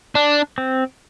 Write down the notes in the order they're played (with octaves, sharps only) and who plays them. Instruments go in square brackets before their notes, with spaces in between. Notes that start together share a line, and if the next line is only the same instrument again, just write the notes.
[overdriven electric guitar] D4
[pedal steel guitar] C4